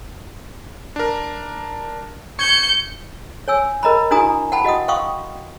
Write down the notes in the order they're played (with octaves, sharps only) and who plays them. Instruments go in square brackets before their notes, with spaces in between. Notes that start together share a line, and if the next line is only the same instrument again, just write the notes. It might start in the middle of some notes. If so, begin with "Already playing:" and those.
[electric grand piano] D4 A#4
[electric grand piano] C#6 G#6 [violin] G6 C#7
[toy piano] C#5 G#5 E6
A#4 D#5 A#5 B5
D4 E4 F#4 G#5 A#5 D#6
F#5 G5 A5 B5
F#4 D#5 F#5 D#6
F5 G5 C6 C#6 D#6